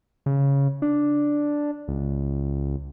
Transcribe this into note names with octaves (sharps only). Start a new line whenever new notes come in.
C#3
D4
C#2